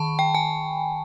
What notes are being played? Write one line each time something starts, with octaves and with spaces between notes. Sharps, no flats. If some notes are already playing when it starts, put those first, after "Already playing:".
Already playing: D#3 A5 B5 C#6
G5
G#5